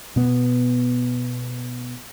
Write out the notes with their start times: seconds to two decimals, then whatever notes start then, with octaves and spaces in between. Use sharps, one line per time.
0.16 B2 B3